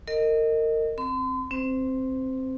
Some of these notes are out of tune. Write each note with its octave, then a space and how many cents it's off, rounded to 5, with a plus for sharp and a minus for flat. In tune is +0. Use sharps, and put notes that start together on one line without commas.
A#4 -30 D#5 +0
C4 +10 C6 -40
C4 +10 C5 -25